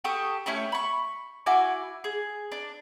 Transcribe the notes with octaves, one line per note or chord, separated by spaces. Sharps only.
G4 A4 C#6 D#6
A3 C#4 E4 G4
B5 C#6
E4 F#4 G#5 D6
G#4
D4